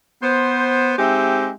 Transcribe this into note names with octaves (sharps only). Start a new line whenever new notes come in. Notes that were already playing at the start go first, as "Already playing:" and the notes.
B3 C5
G#3 C4 D#4 G4 E5